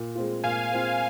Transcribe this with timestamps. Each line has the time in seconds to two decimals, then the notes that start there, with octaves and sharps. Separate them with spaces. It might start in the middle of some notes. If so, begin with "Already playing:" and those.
Already playing: A#2
0.15 G#3 C4 F4
0.44 A#2 F5 G#5
0.71 G#3 C4 F4